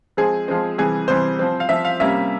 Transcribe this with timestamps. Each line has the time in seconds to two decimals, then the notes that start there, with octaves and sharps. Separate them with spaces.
0.17 F3 G#3 C4 G#4
0.48 F3 G#3 C4
0.78 C3 E3 G3 G#4
1.08 C3 E3 G3 C5
1.39 F3 C4
1.60 F5
1.69 F3 C4 E5
1.85 F5
2.00 C3 G3 A#3 C#4 E5